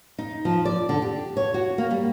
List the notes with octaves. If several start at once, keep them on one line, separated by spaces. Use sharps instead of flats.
D#4
F3
D5
D3
G4
C#5
F#4
A#3
G3